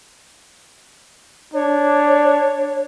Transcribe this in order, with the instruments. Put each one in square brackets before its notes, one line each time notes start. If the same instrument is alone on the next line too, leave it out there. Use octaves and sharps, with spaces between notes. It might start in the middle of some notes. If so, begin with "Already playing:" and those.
[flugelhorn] D4 [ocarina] C#5